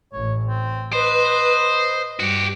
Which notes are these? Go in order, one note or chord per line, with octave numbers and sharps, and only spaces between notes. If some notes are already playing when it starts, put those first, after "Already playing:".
A1 C#5
C4
B4 C5 D#5
G2 F#4 G4